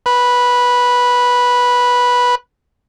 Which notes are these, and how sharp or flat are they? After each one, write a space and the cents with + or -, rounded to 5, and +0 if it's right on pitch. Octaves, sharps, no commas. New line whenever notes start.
B4 -10